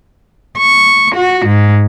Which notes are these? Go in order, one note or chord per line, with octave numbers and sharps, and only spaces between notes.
C#6
F#4
G#2